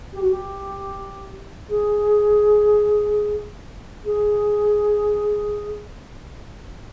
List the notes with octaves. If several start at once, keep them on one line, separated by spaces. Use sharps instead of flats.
G4
F#4
G4
G#4
G#4